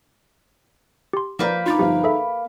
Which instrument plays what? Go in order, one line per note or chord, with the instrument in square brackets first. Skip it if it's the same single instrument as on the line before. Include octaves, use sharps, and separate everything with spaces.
[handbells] G4 C6
[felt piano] F3 D5 A#5 [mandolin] A#3 B4 G6
[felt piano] D4 D6 [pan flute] D#4 [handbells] F4 A6
[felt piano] G1 F3 F5 [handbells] G4
[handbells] G#4 A4 E5 [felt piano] B5